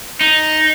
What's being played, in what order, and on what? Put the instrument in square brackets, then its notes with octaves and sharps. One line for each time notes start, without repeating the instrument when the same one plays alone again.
[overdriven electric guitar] D#4